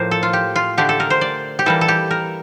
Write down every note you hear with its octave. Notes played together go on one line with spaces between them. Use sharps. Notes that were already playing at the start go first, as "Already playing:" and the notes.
Already playing: A2 F3 A#3 C5
A4
F4
G4
F4
D3 A3 D4 G4
A4
A#4
C5
D5
G4
E3 G3 A#3 A4
A4
G4
A#4